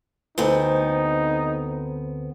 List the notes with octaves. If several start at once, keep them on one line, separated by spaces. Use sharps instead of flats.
D2 B3 C4 D#4